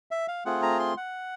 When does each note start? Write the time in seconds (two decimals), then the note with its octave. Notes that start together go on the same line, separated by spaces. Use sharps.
0.11 E5
0.28 F5
0.45 A3 C4 F4 G#4 F#5
0.62 A#5
0.80 C6
0.97 F#5